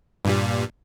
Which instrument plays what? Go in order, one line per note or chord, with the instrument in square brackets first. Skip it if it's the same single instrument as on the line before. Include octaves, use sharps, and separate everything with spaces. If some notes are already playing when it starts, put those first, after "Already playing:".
[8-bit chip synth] G2 A#2 G3